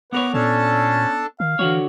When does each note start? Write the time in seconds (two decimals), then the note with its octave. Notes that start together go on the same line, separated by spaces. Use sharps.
0.13 B3 A#4 B4 C#5 F#5 D6
0.34 A#2 C#4 D4 A4 A5
1.40 D#3 F5
1.59 D3 E3 F#4 C#5